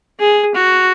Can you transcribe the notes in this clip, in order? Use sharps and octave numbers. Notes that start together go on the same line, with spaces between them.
G#4
F#4